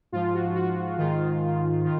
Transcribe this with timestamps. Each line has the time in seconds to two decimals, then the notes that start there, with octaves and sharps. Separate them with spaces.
0.12 G#2 F3 F4
0.34 F#4
0.56 F#4
0.98 G#2 D#3 F4
1.84 D#3 F4